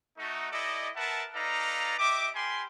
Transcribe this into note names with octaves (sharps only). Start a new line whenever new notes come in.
A3 D#4 F#4
E4 G4 A4 D5 D#5
A#4 B4 E5 F#5 A5
D#4 A4 B4 D5 F5 A#5
G4 D#5 E5 D6
G4 A#4 G#5 B5 C6